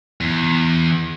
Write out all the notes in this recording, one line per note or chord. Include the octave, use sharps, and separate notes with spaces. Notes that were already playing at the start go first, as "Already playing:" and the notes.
E2